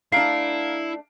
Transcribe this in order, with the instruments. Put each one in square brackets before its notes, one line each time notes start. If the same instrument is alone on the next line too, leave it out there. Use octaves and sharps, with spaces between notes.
[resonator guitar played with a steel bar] A3 D4 [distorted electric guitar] E4 [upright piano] F5 A#5 D7 [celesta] C7